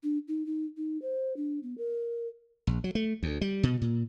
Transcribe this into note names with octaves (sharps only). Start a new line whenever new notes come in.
D4
D#4
D#4
D#4
C5
D4
B3
A#4
A#1
F#3
A3
D2
G3
B2
A#2